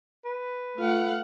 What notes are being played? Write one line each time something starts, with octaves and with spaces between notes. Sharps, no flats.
B4
A3 F4 F5 F#5